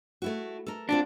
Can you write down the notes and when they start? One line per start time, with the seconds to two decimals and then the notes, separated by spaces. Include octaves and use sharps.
0.22 A3 E4 F#4
0.67 A4 A#4
0.89 C4 D4 F4 F#4